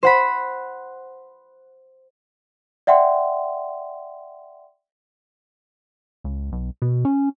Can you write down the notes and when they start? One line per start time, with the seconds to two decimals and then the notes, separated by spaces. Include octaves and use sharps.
0.03 C5 F#5 B5
2.87 D5 E5 F#5 G5 C6
6.24 C#2
6.52 B1
6.82 B2
7.05 C#4